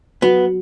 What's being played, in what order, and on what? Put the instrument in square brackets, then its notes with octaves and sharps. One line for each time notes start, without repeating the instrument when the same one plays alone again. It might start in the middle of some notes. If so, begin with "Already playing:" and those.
[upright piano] F#3 [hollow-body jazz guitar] B3